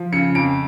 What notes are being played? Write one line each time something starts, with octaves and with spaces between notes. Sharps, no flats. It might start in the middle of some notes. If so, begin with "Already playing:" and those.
Already playing: F3
C#3 C#7
F2 D7